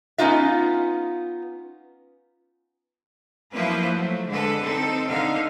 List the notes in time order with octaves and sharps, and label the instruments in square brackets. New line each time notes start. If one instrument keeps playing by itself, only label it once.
[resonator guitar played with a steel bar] B3 C#4 D#4 F4 E5
[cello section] F3 F#3 A#3 E4 B4 C5
F#3 A3
D3 G#3 A4 B4
C4 D#4 A4
D3 D#4 F5